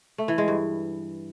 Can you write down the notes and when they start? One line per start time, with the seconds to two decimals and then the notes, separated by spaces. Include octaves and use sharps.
0.18 A3
0.28 E3
0.38 G#3
0.48 G2